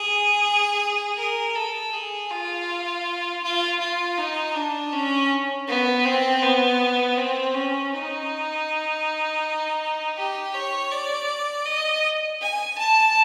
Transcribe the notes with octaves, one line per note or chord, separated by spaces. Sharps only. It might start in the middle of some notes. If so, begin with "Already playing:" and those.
Already playing: G#4
A#4
A4
G#4
F4
F4
F4
D#4
D4
C#4
B3
C4
B3
C4
C#4
D#4
G4
C#5
D5
D#5
G#5
A5